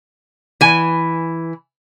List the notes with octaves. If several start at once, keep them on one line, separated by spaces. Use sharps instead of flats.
E3 G#5